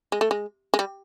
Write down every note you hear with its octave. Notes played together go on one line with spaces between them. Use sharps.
G#3
A3
G#3
G#3
G3